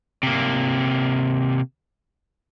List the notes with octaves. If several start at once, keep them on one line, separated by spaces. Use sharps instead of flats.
C3 A#3